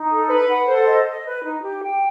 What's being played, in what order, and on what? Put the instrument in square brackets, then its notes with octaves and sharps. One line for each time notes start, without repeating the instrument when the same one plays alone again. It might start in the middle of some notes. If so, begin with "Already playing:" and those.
Already playing: [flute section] D#4
A4
[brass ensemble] B4 [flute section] B5
[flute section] F#5
[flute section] A4 [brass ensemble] C5
[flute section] D#5
D#5
B4
D#4
G4
G5